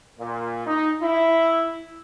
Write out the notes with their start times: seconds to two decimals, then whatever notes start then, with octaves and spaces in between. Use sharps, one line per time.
0.18 A#2
0.66 D#4
1.02 E4